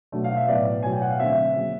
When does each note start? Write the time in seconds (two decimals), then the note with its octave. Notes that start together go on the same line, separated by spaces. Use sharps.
0.12 B2 F#3 A3 D4
0.24 F5
0.36 E5
0.48 A2 F#3 B3 D5
0.83 B2 F#3 A3 G#5
0.92 G5
1.02 F#5
1.10 F5
1.19 D3 F#3 A3 C4 E5
1.56 C#3 F#3 A#3